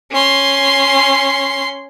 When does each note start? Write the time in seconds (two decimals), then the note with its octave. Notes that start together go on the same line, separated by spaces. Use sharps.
0.11 C#4 C6